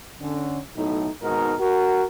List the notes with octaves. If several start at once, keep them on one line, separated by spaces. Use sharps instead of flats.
D3 C#4
B1 A2 D#4
G#1 G#2 B2 D#4 F#4 A#4
F#4 A#4